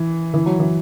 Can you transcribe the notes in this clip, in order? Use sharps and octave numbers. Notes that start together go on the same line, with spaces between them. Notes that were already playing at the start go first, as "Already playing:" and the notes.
Already playing: E3
E3
F#3
E3